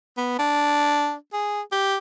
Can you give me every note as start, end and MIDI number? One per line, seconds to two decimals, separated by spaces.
0.17 0.34 59
0.39 1.14 62
1.33 1.61 68
1.72 1.98 67